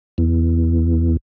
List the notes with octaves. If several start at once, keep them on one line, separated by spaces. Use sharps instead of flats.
E2